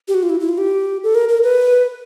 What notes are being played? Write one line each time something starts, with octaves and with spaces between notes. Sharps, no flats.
G4
F#4
F4
E4
E4
F4
G4
A4
A#4
A#4
B4